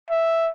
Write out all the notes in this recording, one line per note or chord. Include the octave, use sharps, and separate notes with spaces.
E5